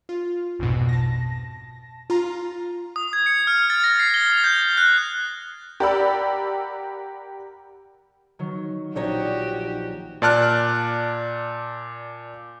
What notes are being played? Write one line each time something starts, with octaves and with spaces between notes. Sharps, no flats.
F4
A#1 F2 G#2 B2
A5 A#6
F4 A#5
D#6
G#6
C#7
F6
A6
A#6
C7
G7
D#6
G6
F#6
G4 A#4 D5 F#5 B5 E6
D#3 F#3
A#1 D#4 F#4 G4 C#5 D5
A#2 D5 A5 F6 F#6